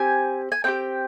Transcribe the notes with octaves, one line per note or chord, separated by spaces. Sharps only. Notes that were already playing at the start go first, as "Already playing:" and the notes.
Already playing: C4 G4 G#5
G#5
C4 D#4 G4 G5